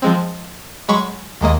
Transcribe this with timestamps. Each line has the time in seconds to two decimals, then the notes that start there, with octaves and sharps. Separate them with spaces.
0.02 F3 G#3 C4
0.89 F#3 G#3 B5 C#6
1.41 D#2 G#3 A#3 D#5